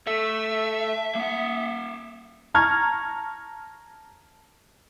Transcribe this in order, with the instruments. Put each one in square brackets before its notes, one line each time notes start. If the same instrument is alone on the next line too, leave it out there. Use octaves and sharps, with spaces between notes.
[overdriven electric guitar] A3 [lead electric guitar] E5
[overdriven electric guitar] A#3 F#5
[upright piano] A5 A#5 C#6 F6 G#6